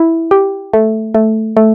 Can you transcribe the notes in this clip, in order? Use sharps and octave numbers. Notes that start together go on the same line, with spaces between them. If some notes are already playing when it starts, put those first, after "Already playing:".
Already playing: E4
G4
A3
A3
A3